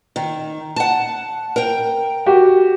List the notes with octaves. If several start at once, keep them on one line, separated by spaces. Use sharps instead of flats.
D#3
F#5 A5
A#4 G5
F#4 G4